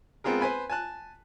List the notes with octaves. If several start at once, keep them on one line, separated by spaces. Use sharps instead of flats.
G#3 B3 C4 F4 G#4 A#4
B4 C5 G#5 B5
G#5 A5 F#6